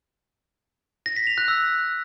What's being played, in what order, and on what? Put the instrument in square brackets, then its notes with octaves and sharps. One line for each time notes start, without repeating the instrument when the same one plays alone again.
[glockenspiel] A#6
B6
F7
F#6
E6